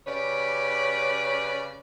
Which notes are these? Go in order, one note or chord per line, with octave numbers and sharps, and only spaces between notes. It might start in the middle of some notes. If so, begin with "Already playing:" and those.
C#3 G4 B4 C#5 D5